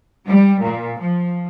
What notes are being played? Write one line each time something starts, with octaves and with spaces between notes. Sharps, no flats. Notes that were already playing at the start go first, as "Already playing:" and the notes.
G3
A#2
F3